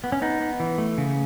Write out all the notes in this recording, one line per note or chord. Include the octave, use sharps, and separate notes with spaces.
B3
C#4
B3 D#4
B3
E3
A3
C#3